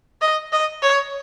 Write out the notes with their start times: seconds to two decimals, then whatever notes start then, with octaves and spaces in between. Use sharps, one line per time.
0.22 D#5
0.52 D#5
0.82 C#5